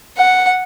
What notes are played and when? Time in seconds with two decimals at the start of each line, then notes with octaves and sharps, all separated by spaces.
0.17 F#5